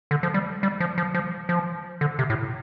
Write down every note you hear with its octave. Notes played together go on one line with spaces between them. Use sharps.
D3
F3
G3
G3
F3
F3
F3
F3
D3
C3
A2